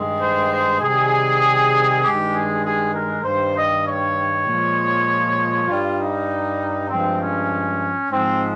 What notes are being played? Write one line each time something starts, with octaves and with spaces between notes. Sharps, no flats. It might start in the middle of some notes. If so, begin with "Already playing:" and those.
Already playing: G2 D#3 G#3
C5
C5
C3 D#3 G3 G#4
G2 D#3 G#3 G4
G#4
G#4
A#4
G2 D#3 G3 C5
D#5
C#5
A#2 F3 G#3
G2 G3 F4
D#4
G2 F3 G#3 C4
C#4
G#2 F3 G#3 C4